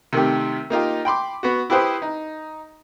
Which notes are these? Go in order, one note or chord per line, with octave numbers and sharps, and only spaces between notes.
C3 D#3 A3 G4
A#3 D#4 F4 G4
G5 B5 C6 D6
B3 F#4
E4 G4 B4 C5 G5 D#6
D#4